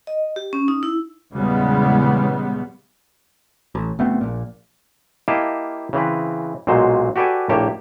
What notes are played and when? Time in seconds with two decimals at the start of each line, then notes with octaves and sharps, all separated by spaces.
0.07 D#5
0.36 G4
0.53 C#4
0.68 D#4
0.83 E4
1.32 E2 A#2 C#3 G3 G#3 B3
3.75 A1
3.99 F#1 A3 B3 C4
4.21 A#1 A#2
5.28 A#3 E4 G4 D#5 F5 A5
5.93 C#3 E3 C4 B4
6.67 B1 A#2 F#3 G#3 C5
7.16 F#4 G4 A4 B4 D5 G#5
7.49 A#1 A2 A#3 G4 C#5 A5